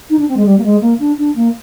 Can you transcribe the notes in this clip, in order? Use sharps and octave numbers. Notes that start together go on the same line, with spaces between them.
D#4
D4
C4
G#3
G3
A#3
G#3
A#3
D4
D4
A#3